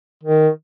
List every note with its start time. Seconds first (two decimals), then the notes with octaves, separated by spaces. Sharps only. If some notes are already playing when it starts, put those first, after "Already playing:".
0.23 D#3